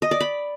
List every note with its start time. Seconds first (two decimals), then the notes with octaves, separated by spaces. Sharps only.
0.02 D#5
0.11 D5
0.20 B5